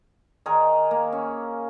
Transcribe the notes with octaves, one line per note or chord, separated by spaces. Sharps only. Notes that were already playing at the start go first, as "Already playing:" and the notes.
D#3 D#4 G#4 A#4
A#3
C#4